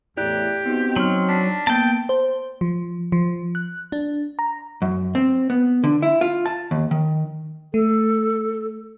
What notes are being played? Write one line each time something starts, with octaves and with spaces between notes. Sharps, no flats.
E2 A2 E4 G4 D5 F#6
B3 C4 D#4 F#4
F#3 C6 F6
D4 A5 B6
A#3 B3 G5 A5 D7
C5
F3
F3
F#6
D4
A#5
F#2
C4
B3
D3
E4
F4
A5
D#2
D#3
A3 A4